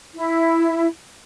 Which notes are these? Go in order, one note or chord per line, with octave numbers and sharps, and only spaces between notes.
E4